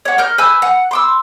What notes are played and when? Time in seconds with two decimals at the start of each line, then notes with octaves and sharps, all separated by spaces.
0.05 C#5 F#5
0.18 A#4 F6 G6
0.38 B4 G#5 E6 G6
0.62 F#5
0.91 C6 D6 E6